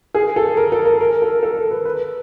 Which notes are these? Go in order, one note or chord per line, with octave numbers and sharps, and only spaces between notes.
G#4
A4
A#4
A4
A#4
A#4
A4
A4
A#4
B4
B4